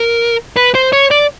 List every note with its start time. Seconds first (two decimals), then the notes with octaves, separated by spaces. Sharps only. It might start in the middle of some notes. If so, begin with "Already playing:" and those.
Already playing: A#4
0.56 B4
0.75 C5
0.93 C#5
1.11 D5